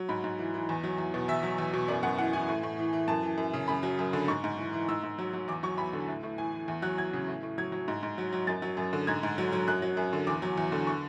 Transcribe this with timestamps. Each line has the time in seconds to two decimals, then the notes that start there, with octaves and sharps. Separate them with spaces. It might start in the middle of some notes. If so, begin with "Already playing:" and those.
Already playing: F#3
0.09 G#2 B5
0.24 G#2
0.38 E3
0.54 E3
0.69 E2
0.84 F#3
0.98 E2
1.14 B2
1.28 E2 E5
1.43 F#3
1.58 E2
1.73 B2
1.88 F#2 D5
2.03 F#2 F#5
2.18 E3 F#5
2.33 E3 G#5
2.48 A2
2.63 A2
2.79 E3
2.93 E3
3.08 F#2 A5
3.23 E3
3.38 F#2
3.54 C#3
3.68 F#2 B5
3.83 F#3
3.99 F#2
4.13 D3
4.28 G#2 C#6
4.44 G#2
4.58 E3
4.73 E3
4.88 G#2 E6
5.03 G#2
5.19 F#3
5.33 F#3
5.48 E2 D6
5.63 F#3 C#6
5.77 E2 B5
5.93 D3
6.08 A2
6.23 A2
6.38 E3 G#5
6.52 E3
6.68 E2
6.82 F#3 F#6
6.98 E2 G#6
7.13 C#3
7.28 A2
7.43 A2
7.58 F#3 G#6
7.72 F#3
7.88 G#2
8.03 G#2
8.18 F#3
8.33 F#3
8.47 F#2 A6
8.62 F#3
8.77 F#2
8.93 D3
9.07 G#2 G#6
9.23 G#2
9.38 F#3
9.53 F#3
9.67 F#2 F#6
9.82 F#3
9.97 F#2
10.13 D3
10.27 E2 D6
10.42 F#3
10.58 E2
10.72 D3
10.87 C#6